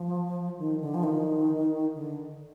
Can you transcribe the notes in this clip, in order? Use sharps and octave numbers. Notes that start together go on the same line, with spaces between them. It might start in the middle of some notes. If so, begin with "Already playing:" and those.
Already playing: F3
D#3
D3
F3
D#3
D3